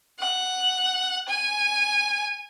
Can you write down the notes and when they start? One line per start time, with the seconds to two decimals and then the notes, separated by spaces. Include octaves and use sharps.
0.20 F#5
1.29 G#5